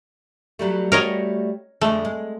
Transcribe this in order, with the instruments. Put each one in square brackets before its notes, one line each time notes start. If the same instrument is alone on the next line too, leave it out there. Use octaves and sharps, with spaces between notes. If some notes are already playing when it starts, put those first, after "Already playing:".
[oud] F#3 G3 A3
[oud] G3 A3 F#4 [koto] A#4 C#5 D#5
[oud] F2 D3 G#3 [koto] A3
[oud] G#3